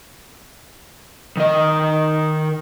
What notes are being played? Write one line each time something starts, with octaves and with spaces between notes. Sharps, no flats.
D#3 D#5